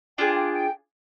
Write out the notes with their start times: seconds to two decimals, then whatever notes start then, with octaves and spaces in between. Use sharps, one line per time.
0.18 D4 F4 G#4 G5
0.35 G5
0.52 G5